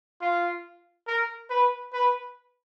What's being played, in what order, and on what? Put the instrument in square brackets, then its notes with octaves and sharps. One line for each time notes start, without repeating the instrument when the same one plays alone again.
[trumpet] F4
A#4
B4
B4